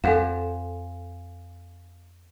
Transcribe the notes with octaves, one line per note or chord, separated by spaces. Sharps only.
F2 A4 F5 F#5 G#5 E7